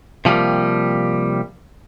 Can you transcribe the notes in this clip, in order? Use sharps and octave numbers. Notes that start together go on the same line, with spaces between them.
C3 F3 G3 A#3